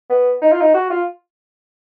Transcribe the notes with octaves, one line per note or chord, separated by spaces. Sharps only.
B3
D#4
F4
D#4
F#4
F4